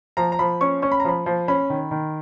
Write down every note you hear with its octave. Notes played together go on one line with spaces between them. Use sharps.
F3 A#5
A#5
F3 B5
C#4 C#6
C#4 C#6
B5
A#5
F3 B5
F3
C#4 B5
D#3
D#3